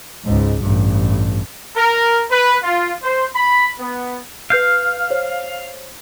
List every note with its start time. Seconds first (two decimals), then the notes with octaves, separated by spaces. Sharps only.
0.24 C#2 G#2
0.62 A1 G2
1.76 A#4
2.31 B4
2.63 F4
3.03 C5
3.35 B5
3.79 B3
4.50 B4 F5 G6 C7
5.10 C5 C#5